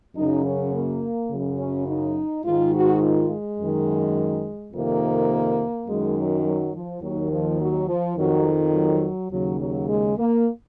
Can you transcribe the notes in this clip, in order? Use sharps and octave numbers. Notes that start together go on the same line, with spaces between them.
F#2 C#3 D#4
C#4
A#3
F#2 C#3
C#4
D#4
G#2 D#3 F4
F#4
F4
G#3
F#2 D#3
F2 C3 D#3 A#3
F#2 D#3 G#3
F#3
F#3
F3
D#2 D#3 F#3
F3
F#3
F3
F2 D#3 F#3
F#3
D#2 C#3 F#3
F#3
G#3
A#3